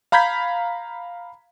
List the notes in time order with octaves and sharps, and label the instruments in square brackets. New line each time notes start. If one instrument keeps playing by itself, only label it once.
[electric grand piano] F5 A#5 B5 G6 G#6 B6